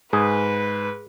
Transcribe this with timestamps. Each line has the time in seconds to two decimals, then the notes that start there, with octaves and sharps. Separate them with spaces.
0.13 G#2 G#4 B4